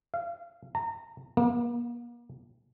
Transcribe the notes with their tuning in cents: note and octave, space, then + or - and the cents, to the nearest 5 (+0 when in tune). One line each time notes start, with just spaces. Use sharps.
F5 -25
A#5 -30
A#3 +40